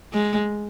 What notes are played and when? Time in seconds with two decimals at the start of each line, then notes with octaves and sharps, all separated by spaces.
0.13 G#3